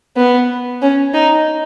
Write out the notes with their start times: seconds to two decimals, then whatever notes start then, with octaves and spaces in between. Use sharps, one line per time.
0.17 B3
0.82 C#4
1.13 D#4